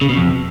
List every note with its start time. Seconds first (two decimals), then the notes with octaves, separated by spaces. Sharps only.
0.01 C#3
0.09 B2
0.17 F2